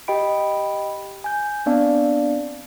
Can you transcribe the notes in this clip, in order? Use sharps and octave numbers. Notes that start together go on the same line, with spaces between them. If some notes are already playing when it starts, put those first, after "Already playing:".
G4 D#5 G5 B5 D7
G#5 G6
B3 C4 D4 D5 F5 A5